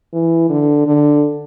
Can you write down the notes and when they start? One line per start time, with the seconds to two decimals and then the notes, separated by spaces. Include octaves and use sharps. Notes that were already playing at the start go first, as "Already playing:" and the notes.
0.13 E3
0.50 D3
0.86 D3